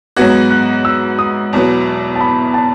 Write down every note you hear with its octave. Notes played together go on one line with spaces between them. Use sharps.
G#2 F#3 B3 F#4 G#6
F#6
E6
D#6
E2 B2 F#3 B3
A5
B5
A5